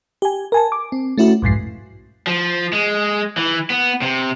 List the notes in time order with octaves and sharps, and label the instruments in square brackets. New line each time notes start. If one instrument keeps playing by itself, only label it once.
[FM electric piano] G4 G#5
A#4 G#5 A5
D6
C4
A3 C#4 E4 F#4
B1 F2 G#2 C7
[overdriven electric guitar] F3
G#3
E3
B3
C3